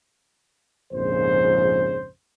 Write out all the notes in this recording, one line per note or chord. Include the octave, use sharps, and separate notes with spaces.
A#1 F2 G#2 C#3 C5